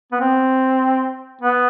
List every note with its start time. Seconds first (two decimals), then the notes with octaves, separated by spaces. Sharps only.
0.12 B3
0.21 C4
1.41 B3